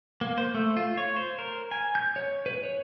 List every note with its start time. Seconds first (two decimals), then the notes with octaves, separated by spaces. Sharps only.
0.21 A#3
0.38 C5
0.55 A3
0.77 F4
0.97 C#5
1.16 C5
1.39 A#4
1.71 G#5
1.95 G6
2.16 C#5
2.46 B4
2.64 C#5